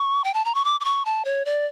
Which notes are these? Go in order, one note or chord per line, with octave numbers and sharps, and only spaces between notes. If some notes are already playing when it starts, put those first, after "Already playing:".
Already playing: C#6
G5
A5
A#5
C#6
D6
D6
C#6
A5
C#5
D5